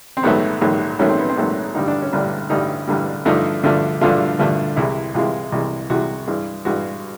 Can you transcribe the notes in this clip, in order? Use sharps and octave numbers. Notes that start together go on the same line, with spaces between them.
C4
A#1 G#2 D#3 F#3 A3 B3
A#1 G#2 D#3 F#3 A3
A#1 G#2 D#3 F#3 A3 C#4
C4
B3
C4
A#1 G#2 D#3 F#3 A3
A1 G2 D3 G3 D#4
D4
C#4
A1 G2 D3 G3 D4
A1 G2 D3 G3 D#4
A1 G2 D3 G3
G2 D3 F3 A3 D#4
G2 D3 F3 A3
G2 D3 F3 A3 F4
G2 D3 F3 A3
C2 C3 E3 G#3 E4
C2 C3 E3 G#3 F4
C2 C3 E3 G#3
C2 C3 E3 G#3 F#4
G2 E3 G#3
G2 E3 G#3 F#4